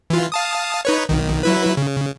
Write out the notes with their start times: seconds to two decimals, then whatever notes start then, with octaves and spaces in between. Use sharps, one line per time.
0.10 E3 F4
0.32 F5 A5 D#6
0.85 D#4 B4 C#5
1.09 B1 D#3
1.43 F#3 E4 B4
1.77 C#3